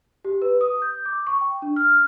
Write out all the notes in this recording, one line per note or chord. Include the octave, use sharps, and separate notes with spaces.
G4
B4
D#6
G6
D6
C#6
G5
D4
F6